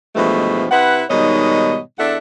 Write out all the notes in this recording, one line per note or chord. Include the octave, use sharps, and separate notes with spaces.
G2 B2 E3 F3 G#3 A3
C3 E4 B4 F#5
G#2 B2 D#3 G3 C#5 D#5
E2 D4 A4 E5 F#5